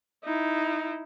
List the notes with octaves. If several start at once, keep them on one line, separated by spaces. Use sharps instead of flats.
D#4 E4